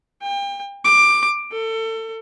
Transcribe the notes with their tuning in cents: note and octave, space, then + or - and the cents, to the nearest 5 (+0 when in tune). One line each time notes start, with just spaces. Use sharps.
G5 +35
D6 +15
A4 +30